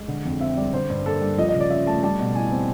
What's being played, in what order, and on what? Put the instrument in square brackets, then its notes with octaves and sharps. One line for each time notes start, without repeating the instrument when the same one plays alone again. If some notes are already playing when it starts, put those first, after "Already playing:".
Already playing: [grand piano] G#3
D3
F2
C4 E5
G3 D5
D3 C5
G2
A#3 A4
G3
F3 D#5
D#5
C#3
D5
C#4 E5
A3 A5
G3 A5
B2
E4 G#5
C4